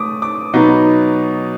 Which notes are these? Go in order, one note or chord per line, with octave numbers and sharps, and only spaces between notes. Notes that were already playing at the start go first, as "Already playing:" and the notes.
Already playing: A3 D6 D#6
D6
B2 F#3 B3 D#4